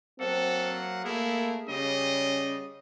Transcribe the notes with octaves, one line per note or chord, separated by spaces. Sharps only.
F#3 A#3 C4 A4 F#5
A3 A#3 E4 G#4 A#4
C#3 G3 C#4 D#5